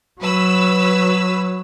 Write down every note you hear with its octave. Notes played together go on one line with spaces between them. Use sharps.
F#3 B4 B5 E6